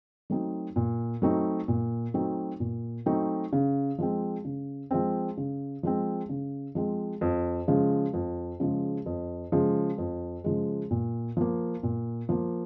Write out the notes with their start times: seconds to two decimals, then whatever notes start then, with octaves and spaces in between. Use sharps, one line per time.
0.30 F#3 A3 C4 D#4
0.76 A#2
1.22 F#3 A3 C4 D#4
1.68 A#2
2.14 F#3 A3 C4 D#4
2.60 A#2
3.06 F#3 A3 C4 D#4
3.53 C#3
3.98 F3 G#3 C4
4.45 C#3
4.91 F3 G#3 C4
5.37 C#3
5.83 F3 G#3 C4
6.29 C#3
6.75 F3 G#3 C4
7.21 F2
7.68 C#3 F3 G#3
8.14 F2
8.60 C#3 F3 G#3
9.06 F2
9.52 C#3 F3 G#3
9.98 F2
10.44 C#3 F3 G#3
10.91 A#2
11.37 F3 A#3
11.83 A#2
12.29 F3 A#3